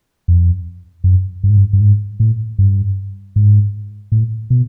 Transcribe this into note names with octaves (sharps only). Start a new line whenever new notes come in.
F2
F#2
G2
G#2
G2
G2
G#2
A2
G2
G#2
A2
B2